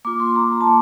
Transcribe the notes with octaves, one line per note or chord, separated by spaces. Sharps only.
A#3 F4 D6
C6
A#5
A#5
A5
A#3